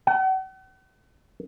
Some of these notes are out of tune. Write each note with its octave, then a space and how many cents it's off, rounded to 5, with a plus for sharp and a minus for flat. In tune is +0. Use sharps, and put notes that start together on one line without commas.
F#5 +45